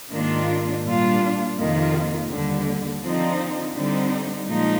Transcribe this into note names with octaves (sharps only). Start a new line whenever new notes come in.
G#2 D#3 A#3 D4 F4
A#2 G3 D4 F4
F2 C3 D#3 A#3 F4
D#2 D3 G3
D3 F3 C4 D#4
D3 G3 C4 D#4
A#2 F3 G#3 D#4